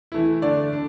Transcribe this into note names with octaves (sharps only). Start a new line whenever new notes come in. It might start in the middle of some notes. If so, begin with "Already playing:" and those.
E3 A3 E4
D3 A3 D4 D5
D4